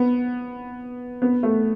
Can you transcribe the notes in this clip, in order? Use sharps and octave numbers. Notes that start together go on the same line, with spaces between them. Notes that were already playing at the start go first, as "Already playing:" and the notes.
Already playing: B3
B3
A3